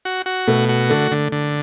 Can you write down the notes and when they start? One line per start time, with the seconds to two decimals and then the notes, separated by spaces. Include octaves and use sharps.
0.05 F#4
0.26 F#4
0.47 B2 A3
0.69 F#4
0.90 D3 A3
1.11 D3
1.32 D3